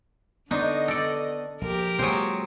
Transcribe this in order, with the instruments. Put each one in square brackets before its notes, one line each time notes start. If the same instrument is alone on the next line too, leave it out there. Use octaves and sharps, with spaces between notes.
[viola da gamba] D3 D#5 [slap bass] B3 [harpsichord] D4 C5 C#5 [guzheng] D#4
[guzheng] A4 D5
[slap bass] A#1 [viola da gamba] G4 A#4
[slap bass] A#2 G#3 [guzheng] F#3 C5 [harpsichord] C4 G#4